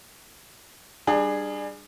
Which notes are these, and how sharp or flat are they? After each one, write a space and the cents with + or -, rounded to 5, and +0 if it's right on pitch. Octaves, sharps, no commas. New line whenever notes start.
G3 +10 D4 +25 G#4 -5